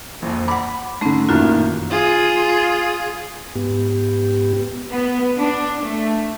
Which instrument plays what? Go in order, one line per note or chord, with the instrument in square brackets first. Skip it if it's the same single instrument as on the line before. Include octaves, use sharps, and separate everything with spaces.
[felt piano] A#1 F2
[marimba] F#5 D6 [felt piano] B5
[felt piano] G#2 D3 [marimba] A3 C4 C#4
[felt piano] A1 A#2 D#3 [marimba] F#2 F4 F#4
[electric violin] F4 G#4
[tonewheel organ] G#2 B3 G4
[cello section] B3
D4
A3